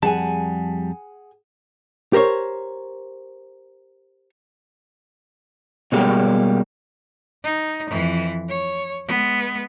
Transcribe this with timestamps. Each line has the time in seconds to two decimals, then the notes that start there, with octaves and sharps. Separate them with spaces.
0.03 F2 G3 G#4 F#5 G#5 A5
2.13 G4 A#4 C5 C#5
5.92 B2 G3 G#3 A#3 F#4 G4
7.43 D#4
7.90 F2 E3
8.49 C#5
9.07 G#3 B3